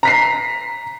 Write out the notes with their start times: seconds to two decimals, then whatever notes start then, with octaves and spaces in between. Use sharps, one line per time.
0.03 A#5 B6 C7